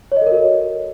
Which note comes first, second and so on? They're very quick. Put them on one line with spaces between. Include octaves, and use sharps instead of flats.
C#5 D#5 A4 A#4 F#4